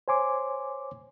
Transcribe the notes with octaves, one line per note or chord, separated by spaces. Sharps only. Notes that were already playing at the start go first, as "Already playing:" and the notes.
C5 C#5 G#5 C6 D6